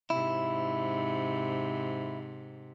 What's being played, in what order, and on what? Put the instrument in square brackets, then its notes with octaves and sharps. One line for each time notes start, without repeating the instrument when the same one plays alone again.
[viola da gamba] G#2 C3 [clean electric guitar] E4